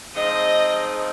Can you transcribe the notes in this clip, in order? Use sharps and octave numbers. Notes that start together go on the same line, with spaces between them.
F3 G#3 C4 D#4 D#5